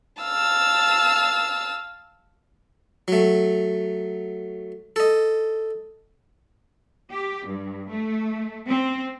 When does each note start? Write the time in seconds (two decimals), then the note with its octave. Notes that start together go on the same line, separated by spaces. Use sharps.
0.23 F5 A5 E6
3.08 F#3 A3
4.96 A4 D#5
7.10 G4
7.46 G2
7.88 A3
8.68 C4